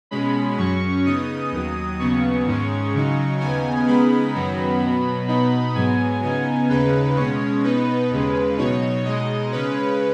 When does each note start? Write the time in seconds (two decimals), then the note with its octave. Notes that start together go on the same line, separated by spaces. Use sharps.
0.11 B2 G#3 C#4 B5
0.58 F#2 F#3 C#4 C#6
1.05 C#3 B3 D#4 D#6
1.52 D#2 D#3 F#3
1.99 D#2 C#3 F#3 B3 C#6
2.46 G#2 D#3 G#3 C#4
2.93 C#3 F#3 D#4
3.40 D#2 C#3 B3 D#4 G#5
3.87 C#3 G#3 B3 D#4 B5
4.34 F#2 D#3 F#3 B3 B5
4.81 B2 F#3 B3
5.28 B2 B3 D#4 B5
5.75 G#2 F#3 B3 G#5
6.22 C#3 B3 D#4 G#5
6.69 D#2 C#3 G#3 D#4 B4
7.17 B2 G#3 C#4 C#5
7.63 B2 B3 D#4 B4
8.11 D#2 C#3 G#3
8.58 B2 F#3 D#4 C#5
9.05 B2 G#3 D#4 D#5
9.52 C#3 G#3 C#4 B4